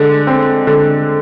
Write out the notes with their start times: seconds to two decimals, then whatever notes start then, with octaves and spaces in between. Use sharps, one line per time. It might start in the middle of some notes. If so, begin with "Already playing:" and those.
Already playing: D3 G#3
0.27 C4
0.67 D3